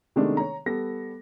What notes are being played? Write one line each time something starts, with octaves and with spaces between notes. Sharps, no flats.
C3 D#3 G#3 A3 B3 D4
C#5 A#5
G3 B3 A4 A#6